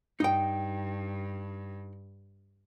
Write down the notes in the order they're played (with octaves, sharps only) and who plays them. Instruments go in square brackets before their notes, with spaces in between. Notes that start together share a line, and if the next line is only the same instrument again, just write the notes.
[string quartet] G2 [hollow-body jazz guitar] D#4 G5